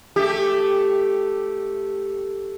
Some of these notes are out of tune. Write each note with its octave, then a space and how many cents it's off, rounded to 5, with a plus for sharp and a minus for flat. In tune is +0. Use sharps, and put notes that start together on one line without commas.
A3 +0 G4 +0